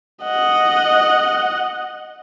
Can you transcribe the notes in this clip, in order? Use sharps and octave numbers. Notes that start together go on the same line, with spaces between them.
D#5 F#5